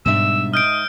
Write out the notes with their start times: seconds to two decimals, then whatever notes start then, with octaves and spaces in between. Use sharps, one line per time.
0.06 G#2 B2 G3 D4 E5 E6
0.54 D#5 F6 G6 D7